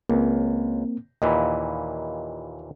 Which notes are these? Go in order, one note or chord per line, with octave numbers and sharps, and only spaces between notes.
C#2 A#3 C4
D#2 A#2 E3 D#5 B5